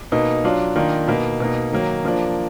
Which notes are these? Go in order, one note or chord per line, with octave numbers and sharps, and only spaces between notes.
B2 A#3 D#4
F#3 D4 F4
D#3 A#3 D4 F4
B2 A#3 D#4
B2 A#3 D#4
D#3 F#3 A#3
F3 A#3 D4